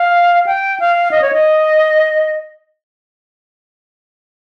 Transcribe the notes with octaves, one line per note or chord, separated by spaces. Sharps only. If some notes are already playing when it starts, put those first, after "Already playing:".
Already playing: F5
G5
F5
D#5
C#5
D#5